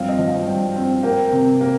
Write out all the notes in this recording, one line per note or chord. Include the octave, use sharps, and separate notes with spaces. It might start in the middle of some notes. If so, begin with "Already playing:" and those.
Already playing: G2 F3 C4 F5
D#5
F3
F5
G2 G5
C4
A#3 G5
C3
A#3